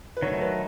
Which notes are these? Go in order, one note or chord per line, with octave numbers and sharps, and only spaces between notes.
B4
D#3 F#3 A3 C#5
B4